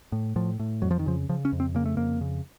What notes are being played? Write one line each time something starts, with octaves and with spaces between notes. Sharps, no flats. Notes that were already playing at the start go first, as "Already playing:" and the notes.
A2
A2 F3
A2
F2 F#3
F3
D#3
C#3 F3
C#3 F3
C#4
F2
C4
C#3 A#3
A3
F2 A#3
C#3